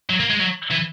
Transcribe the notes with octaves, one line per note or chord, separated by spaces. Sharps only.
F#3
A#3
G#3
F#3
E3